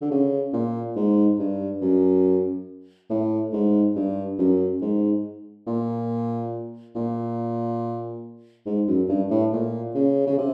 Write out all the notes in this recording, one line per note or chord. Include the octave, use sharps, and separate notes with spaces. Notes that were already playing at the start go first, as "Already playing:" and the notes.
D3
C#3
A#2
G#2
G2
F#2
A2
G#2
G2
F#2
G#2
A#2
A#2
G#2
F#2
G2
A2
A#2
C#3
C#3
C3